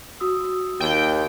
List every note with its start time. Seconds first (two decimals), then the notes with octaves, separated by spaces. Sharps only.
0.20 F#4 D#6 E6
0.80 D#2 G5